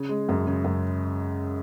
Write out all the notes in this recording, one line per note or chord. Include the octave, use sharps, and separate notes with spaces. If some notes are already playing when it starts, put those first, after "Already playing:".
Already playing: C#3
G#3
F#2
C#3
F#2